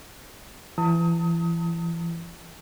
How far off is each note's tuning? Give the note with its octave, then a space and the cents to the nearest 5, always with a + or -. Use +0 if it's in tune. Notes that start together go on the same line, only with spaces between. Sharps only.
E3 +35 A5 +40 D#6 +30